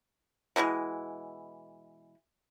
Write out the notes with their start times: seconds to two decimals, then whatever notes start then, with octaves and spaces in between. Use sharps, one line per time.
0.56 B2 E3 F3 G#3